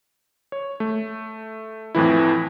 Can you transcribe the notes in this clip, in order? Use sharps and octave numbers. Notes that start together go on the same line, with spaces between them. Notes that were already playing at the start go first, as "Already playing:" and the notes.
C#5
A3
F2 A2 E3 E4